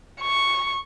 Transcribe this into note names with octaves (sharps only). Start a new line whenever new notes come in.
C#6